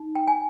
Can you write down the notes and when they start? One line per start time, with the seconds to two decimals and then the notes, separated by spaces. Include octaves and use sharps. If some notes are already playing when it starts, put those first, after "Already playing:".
Already playing: D#4
0.15 G5
0.27 G#5